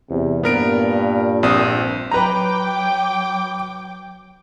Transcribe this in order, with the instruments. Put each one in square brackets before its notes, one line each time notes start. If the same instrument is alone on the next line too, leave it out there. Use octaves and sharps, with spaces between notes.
[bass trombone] E2 [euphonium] C3
[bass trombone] G2 [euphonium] A#2 [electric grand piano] B3 A#4 D7
[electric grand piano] A#1 C4 D#6
[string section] F#3 G5 D6 [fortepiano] B4 A#5